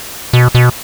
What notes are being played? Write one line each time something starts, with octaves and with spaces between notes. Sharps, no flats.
B2
B2